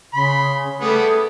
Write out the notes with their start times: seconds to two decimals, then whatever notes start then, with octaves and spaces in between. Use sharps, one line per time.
0.14 C#3 B5 C6
0.81 G3 A3 B3 G#4